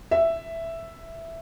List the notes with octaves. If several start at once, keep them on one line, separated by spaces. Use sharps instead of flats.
E5